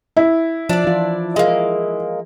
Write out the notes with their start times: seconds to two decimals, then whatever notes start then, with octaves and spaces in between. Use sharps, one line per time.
0.17 E4
0.69 F3 D4 D5
0.84 E3 F4
1.36 G#3 A#3 G#4 A#4